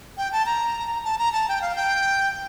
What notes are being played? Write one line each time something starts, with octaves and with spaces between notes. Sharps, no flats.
G5
A5
A#5
A5
A#5
A5
G5
F5
G5